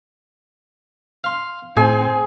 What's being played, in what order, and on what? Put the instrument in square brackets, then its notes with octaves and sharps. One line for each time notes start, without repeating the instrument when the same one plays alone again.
[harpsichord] F5 C6
[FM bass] A2 [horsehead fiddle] C4 [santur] G#4 [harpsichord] G#5